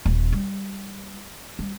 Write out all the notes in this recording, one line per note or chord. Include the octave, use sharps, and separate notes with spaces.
D#1
G3
G3